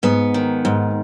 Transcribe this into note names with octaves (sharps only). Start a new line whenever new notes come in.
G#2 B3
D#3
G#2